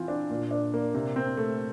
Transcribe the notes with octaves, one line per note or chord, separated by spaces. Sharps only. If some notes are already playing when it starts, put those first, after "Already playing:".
Already playing: E3 C4 F4
D4
A#2
D4
A#3
C3
C4
A3